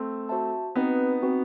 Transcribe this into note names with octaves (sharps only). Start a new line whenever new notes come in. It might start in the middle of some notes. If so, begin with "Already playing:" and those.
Already playing: A3 C4
F#4 C5 E5 A5
B3 C4 D#4 F#4 B4
C4 F#4 B4